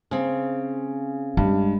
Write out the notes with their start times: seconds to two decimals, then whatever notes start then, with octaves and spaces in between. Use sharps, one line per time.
0.11 C#3 C4
1.37 G2 G#3